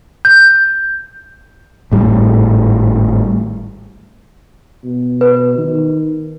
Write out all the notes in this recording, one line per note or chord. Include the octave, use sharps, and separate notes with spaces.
G6
G#1 A2 G3
B2
B4
D#3